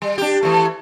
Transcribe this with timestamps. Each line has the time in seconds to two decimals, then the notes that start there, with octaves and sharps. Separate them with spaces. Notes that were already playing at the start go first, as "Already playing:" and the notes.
0.02 G3
0.18 D4 G4
0.43 E3 A3